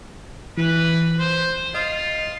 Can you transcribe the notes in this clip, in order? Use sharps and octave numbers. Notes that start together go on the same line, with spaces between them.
E3 B4
C5
F4 D#5